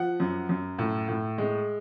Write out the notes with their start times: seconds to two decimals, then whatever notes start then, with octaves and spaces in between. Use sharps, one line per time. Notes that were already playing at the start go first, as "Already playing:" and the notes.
Already playing: F3 F#5
0.20 F#2
0.49 F#2
0.79 A2
1.08 A2
1.38 G#3